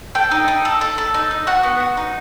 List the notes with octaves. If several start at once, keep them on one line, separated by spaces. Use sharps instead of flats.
A4 G5
D#4
D#4
A4
A4
A4
D#4
D#4
F#4 F#5
B3
F#4
D#4